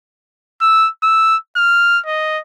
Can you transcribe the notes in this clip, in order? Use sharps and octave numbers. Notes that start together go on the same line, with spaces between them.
E6
E6
F6
D#5